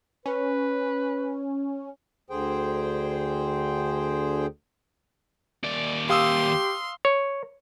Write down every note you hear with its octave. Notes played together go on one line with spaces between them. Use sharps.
C#4 B4
D2 D3 G#4 C5 G5
D#2 D5
G4 F5 C6 D#6 E6
C#5